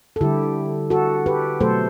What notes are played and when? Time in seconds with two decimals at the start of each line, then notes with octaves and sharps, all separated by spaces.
0.16 A4
0.21 D3 G3 E4 G4
0.90 F#4 A4
1.26 G4 B4
1.60 B2 F#3 A3 A4 C5